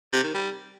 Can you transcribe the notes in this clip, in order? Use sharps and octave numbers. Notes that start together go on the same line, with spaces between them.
C3
D#3
G3